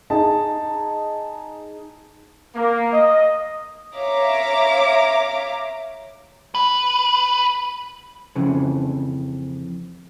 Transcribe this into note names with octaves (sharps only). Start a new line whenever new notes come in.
D#4 G#4 A5
A#3
D#5
C#5 E5 F5 A#5 D6
B4
F2 C#3 E3